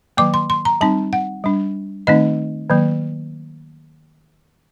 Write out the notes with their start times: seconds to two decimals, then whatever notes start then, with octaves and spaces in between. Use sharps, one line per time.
0.17 D#3 F#3 A#3 D6
0.34 C6
0.50 C6
0.65 A#5
0.81 G3 C4 D#4 A5
1.13 F#5
1.44 G3 D4
2.07 D#3 A3 C4 D#4 D#5
2.70 D#3 F#3 A#3